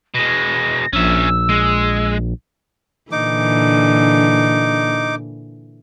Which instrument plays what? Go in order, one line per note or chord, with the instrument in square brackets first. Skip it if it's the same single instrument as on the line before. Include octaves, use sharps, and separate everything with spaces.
[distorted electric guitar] B2 G#3 [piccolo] A#6
[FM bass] A#1 [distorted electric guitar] C#4 E5 [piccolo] E6
[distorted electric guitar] G#3
[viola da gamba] A#2 D3 E3 [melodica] D#4 D6